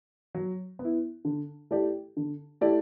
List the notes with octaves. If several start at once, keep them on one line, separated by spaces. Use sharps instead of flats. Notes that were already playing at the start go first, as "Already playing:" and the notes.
F#3
B3
E4
D3
A3 E4 G4 D5
D3
A3 E4 G4 D5